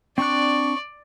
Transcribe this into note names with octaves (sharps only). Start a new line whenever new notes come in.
C4 D4 D5 C#6 F#6